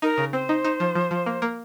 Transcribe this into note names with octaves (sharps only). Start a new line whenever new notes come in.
D#4 A#4
C#3
C4 C5
D#4
D#4
F3
F3
F3
A#3
A#3